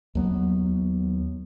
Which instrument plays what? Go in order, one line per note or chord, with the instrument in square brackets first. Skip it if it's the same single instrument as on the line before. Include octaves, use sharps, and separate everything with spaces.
[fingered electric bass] D#2 F#3 B3